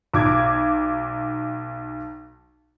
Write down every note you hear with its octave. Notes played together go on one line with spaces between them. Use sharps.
B1 D6 G#6